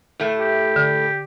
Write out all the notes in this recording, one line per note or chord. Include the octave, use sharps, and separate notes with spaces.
A2 A3
G4
D3